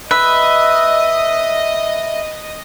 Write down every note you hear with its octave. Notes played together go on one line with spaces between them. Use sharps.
B4 D#5 E5